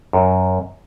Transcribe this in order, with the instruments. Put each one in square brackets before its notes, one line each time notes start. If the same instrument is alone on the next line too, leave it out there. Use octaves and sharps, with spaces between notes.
[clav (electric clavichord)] F#2